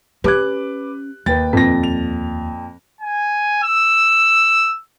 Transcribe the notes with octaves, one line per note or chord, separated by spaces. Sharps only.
C#4 G4 B4 D6 F#6 G#6
D#2 B4 G5 A6
F2 A#2 C4 A#6
F7
G#5
E6